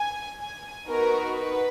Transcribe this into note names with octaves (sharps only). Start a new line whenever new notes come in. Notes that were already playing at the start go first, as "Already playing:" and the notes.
Already playing: G#5
G#5
B3 D#4 F#4 A#4
B4